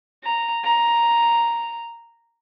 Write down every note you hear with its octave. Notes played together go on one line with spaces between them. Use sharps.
A#5
A#5